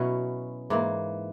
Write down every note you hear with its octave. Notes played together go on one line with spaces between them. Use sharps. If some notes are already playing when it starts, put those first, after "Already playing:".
Already playing: B2 F#3 C#4 E4
G#2 E3 A#3